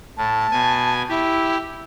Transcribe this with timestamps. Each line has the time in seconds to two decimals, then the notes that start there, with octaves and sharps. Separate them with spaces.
0.17 A2 A5
0.52 B2 G#5
1.09 E4 G4